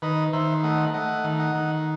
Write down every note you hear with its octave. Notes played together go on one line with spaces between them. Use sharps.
D#3 B4 D#5
D#3 C5 E5
A3 D#5 F#5
A3 D#5 F#5
D#3
D#5 F#5
D#3